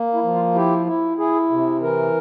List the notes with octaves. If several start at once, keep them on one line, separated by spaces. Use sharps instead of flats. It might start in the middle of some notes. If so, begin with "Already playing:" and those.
Already playing: A#3
E4
F3
F4
E4 G4
E4
E4 G#4
C3
E3 A#4